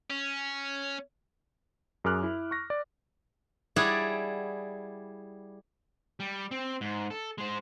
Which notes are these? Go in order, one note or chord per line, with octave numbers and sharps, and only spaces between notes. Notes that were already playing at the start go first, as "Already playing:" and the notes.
C#4
F#2 G#4 A#4 D6 F6 F#6
E4
C#6 F#6 A#6
D5
G3 E4 G#4 C#5 D5 F#5
G3
C4
G#2
A4
G#3 C5